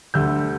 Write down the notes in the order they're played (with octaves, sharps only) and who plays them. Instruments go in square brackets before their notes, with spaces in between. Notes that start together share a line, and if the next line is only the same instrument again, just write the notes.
[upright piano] D2 D3 G3 E6 G6